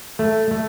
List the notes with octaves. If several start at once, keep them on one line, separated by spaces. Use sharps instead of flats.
A3
A3